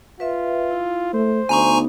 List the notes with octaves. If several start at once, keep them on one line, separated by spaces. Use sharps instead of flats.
F4 B4 E5
E4
A3 C5
D2 B3 D4 D#4 G#5 A#5 C#6